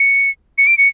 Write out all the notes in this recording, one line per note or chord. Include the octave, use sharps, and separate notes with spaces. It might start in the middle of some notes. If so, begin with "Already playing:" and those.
Already playing: C#7
C#7
D7
C#7